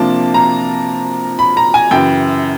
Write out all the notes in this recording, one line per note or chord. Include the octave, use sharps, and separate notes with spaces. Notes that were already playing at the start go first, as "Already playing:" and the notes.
Already playing: C3 F3 A#3 D4 F4 A5
A#5
B5
A#5
G#5
F#2 C#3 E3 G5